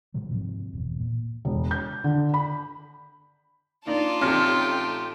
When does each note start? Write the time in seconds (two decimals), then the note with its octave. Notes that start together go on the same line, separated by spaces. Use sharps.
0.14 A2 C3 F#3 G#3
0.29 G#2 C3 F3
0.73 E1 E2
1.00 A#2
1.45 E1
1.71 G6
2.04 D3
2.34 B5
3.87 A#3 D4 D#4 F4 D5 A5
4.21 A1 C3 C#4 D#4 A4 G5 F6